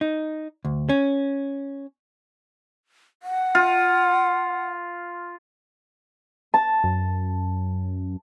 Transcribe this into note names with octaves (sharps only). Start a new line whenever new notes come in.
D#4
D2
C#4
F#5
F4
A5
F#2